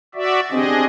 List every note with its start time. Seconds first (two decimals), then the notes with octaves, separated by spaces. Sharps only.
0.15 F#4 D5 E5
0.51 C4 D4 G4 G#4 D#5